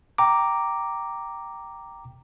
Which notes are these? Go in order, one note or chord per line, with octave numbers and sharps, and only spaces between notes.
G5 A#5 D6